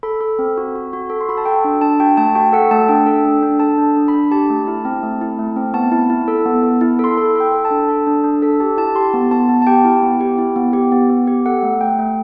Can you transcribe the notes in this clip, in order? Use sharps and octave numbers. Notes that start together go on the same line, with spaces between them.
A4 B5
A4
C4
F#4
F#4
F#4
A4
C6
F#4 B5
A5
A4 G5
D4
D4 A5
F#4 G5
A3 A5
F#4 G5
A4 F#5
A3 A5
D4 G5
A4
D4
D4
A4 A5
D4
D4
B5
D4
G4 A5
A3
E4
C4
A3
E4
A3
C4
B3 A5
E4
E4
A4
B3
B3
E4
A4 C6
A4 B5
A4 G5
A4
A5
D4
A4
D4
D4
A4
G4 A5
E4 A5
G4 C6
B3
B3 A5
B3
A5
G4 G5
E4
B3
G4
E4
B3
G4
B3
B3
G4
A4 F#5
A3
A3 G5
A3